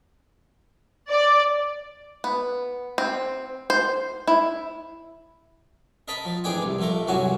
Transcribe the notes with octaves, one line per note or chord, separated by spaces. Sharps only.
D5
B3
C4
C5
E4
A#4 D#5 A5 B5
F3
A1 D4 G#4 D5 G5 G#5
C2
A#1 A3 A#4
C2 G2 F#3 F#4 G#5